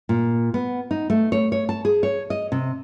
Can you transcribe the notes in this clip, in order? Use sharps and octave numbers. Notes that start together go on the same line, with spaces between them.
A#2
B3
D#4
A3
C#5
C#5
A5
G#4
C#5
D#5
C3